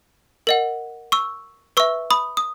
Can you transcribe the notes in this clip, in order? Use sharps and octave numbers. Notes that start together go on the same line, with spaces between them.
A#4 D#5 F#5
C#6 E6
B4 E5 C#6 E6
B5 D#6
D#6